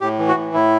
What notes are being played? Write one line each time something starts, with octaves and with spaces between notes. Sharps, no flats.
A2 G4
E3
F#4
A2
A2 E4